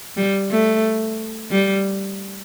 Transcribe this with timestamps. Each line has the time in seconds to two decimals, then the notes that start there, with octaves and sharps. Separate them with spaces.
0.17 G3
0.51 A3
1.51 G3